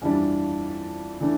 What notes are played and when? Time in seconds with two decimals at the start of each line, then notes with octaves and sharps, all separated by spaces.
0.02 F2 E3 G3 D4
1.20 E3 A3 D4